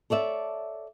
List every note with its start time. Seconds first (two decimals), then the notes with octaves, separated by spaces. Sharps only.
0.10 A4 C#5 D5 E5